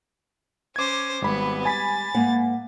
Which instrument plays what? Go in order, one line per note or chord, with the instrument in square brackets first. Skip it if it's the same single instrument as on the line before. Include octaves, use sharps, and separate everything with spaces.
[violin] C#4 C5 [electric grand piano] D6 G#6
[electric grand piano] G#1 B5 [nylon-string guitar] G3 G#3 [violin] B3
[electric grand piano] G#5 B5 B6 [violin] A6
[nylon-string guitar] G#2 A#3 F#5